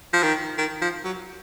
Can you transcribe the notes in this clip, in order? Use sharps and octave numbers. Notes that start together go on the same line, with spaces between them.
F3
D#3
D#3
F3
F#3